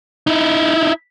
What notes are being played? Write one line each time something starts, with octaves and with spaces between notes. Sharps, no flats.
D#4 E4